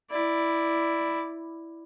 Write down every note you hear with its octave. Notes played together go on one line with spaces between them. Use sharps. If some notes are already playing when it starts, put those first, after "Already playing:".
E4 D5